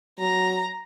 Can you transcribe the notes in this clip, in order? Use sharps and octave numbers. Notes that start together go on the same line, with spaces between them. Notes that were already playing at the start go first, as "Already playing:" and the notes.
F#3 A#5